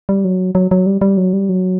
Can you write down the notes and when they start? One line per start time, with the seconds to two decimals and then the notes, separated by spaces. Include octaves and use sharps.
0.09 G3
0.25 F#3
0.55 F#3
0.71 F#3
0.86 G3
1.01 G3
1.17 F#3
1.33 G3
1.49 F#3